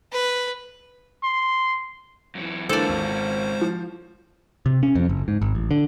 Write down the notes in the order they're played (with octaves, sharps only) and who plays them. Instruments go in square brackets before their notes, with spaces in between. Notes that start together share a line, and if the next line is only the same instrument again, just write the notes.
[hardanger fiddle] B4
[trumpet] C6
[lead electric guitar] F#2 E3
[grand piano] D3 E3 A#3 [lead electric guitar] G#3 F4 [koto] A4 D5 [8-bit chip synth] C5
[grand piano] G#1
F3
[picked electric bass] C3
C#4
F2
F#1
G#2
G#1
A1
D3